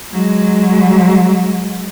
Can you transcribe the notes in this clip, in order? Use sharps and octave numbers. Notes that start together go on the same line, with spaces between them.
F#3 G#3